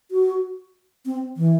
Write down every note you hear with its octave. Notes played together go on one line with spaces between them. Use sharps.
F#4
C4
E3